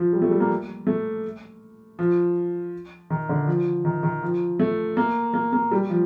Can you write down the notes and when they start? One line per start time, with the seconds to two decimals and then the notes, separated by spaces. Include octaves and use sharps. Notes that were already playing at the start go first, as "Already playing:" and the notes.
Already playing: F3
0.13 G3
0.22 A3
0.31 G3
0.40 A#3
0.87 A3
1.99 F3
3.10 D#3
3.29 D3
3.47 F3
3.85 D#3
4.03 D#3
4.22 F3
4.59 A3
4.97 A#3
5.34 A#3
5.53 A#3
5.71 G3
5.90 F3